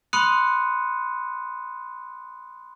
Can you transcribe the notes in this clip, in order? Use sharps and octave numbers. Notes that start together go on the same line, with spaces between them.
B5 C6 D#6 F#6 C#7 D#7